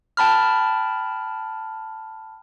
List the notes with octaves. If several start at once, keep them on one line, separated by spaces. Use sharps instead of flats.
G5 A5 B5 F6